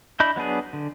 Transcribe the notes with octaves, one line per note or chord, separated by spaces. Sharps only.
D4 E4 D#5 B5 G6
F#3 B3 D4 G#4
D3